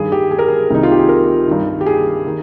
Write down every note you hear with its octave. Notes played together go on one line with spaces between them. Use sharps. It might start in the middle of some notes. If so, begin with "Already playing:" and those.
Already playing: G2 D#3 G#4
G4
G#4
A#4
G#4
C2 C3 D#3 D#4
F4
G4
G#4
A#4
G2 D#3
G4
G#4
D#3